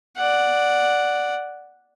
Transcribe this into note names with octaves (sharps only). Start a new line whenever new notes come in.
D5 F#5